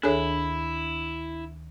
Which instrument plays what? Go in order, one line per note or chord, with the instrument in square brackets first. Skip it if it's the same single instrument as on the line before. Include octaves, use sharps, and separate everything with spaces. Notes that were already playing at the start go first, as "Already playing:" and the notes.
[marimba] D2 D#3 E5 [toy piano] D4 [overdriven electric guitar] E4 [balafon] G#4 A4 C#5